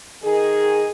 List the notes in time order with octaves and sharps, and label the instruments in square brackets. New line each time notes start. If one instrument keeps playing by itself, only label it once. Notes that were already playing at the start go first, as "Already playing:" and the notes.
[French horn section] D#3 G#4